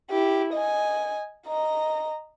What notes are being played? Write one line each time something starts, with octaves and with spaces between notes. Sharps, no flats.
E4 G4
D#5 G#5
D#5 A#5